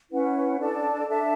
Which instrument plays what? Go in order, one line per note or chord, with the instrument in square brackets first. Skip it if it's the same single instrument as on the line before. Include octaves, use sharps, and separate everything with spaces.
[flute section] C#4 E4 B4 F#5
D4 A4 D5 A5
D4 A4 E5 A5